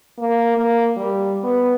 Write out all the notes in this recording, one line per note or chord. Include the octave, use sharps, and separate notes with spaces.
A#3
A#3
G3
B3